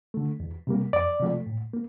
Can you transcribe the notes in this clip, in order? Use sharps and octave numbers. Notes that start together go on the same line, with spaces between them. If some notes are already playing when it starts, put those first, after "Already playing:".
D3 A3
E2
C3 G3 A#3
F2 D5
C3 F3 A3
A2
A#3